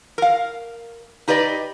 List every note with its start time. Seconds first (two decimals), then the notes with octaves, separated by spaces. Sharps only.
0.18 A#4 F5
1.28 D#4 G4 B4 D5 D#5